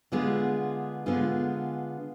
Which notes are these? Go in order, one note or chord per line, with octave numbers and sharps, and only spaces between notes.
D3 G#3 B3 F4 G#4
D3 G#3 B3 F4 G#4